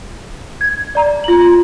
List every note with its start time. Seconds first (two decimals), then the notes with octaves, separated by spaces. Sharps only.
0.61 G#6
0.95 D5 A#5
1.24 F4 F#7